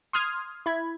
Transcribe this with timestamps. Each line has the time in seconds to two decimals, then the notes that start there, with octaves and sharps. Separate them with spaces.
0.13 C6 D#6 F6 G#6
0.66 E4 B5 G#6